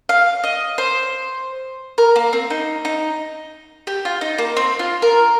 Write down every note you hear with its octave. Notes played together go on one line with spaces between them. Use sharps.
F5
D#5
C5
A#4
A#3
C4
D#4
D#4
G4
F4
D#4
A#3
C4
F4
A#4